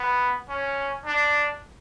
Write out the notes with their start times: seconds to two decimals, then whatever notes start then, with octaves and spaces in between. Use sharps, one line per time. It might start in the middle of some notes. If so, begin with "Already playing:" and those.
Already playing: B3
0.49 C#4
1.06 D4